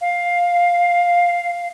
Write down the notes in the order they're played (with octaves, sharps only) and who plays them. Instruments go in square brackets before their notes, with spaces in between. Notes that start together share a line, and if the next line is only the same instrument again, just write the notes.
[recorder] F5